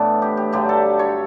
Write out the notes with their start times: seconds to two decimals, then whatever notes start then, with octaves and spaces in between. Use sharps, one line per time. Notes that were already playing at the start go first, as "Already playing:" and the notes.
Already playing: A2 E3 A3 B3 D4
0.22 G4
0.37 G4
0.52 G2 D3 F#3 G4
0.69 A4
0.99 C#5